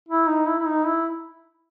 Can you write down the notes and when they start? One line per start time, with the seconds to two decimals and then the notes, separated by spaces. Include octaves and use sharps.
0.08 E4
0.28 D#4
0.48 E4
0.59 E4
0.67 D#4
0.86 E4